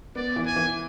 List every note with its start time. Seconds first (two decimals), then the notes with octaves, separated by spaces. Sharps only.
0.16 B3 D5
0.36 E3
0.46 G#5
0.56 E3